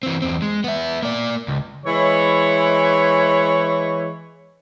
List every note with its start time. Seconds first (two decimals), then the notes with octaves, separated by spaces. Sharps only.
0.03 E3 C4
0.22 E2 C4
0.42 G#3
0.64 B3 E5
1.03 A#3 D5
1.48 C#2
1.85 E3 G#3 E4 C#5